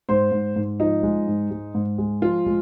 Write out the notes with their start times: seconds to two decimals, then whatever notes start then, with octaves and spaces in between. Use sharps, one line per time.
0.09 G#2 C5
0.32 G#2
0.56 G#2
0.80 F3 D#4
1.03 G#3
1.27 G#2
1.51 G#3
1.75 G#2
1.98 G#3
2.22 F3 F4
2.46 G#3